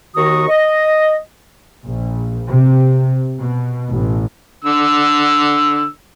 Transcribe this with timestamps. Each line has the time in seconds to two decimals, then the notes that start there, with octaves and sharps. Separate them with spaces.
0.16 D#2 D#3 F#4 A#5 C#6 D#6
0.49 D#5
1.88 A#1
2.49 C3
3.40 B2
3.90 A1
4.64 D3 E6